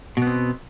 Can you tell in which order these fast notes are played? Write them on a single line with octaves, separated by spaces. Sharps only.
B2 B3 C4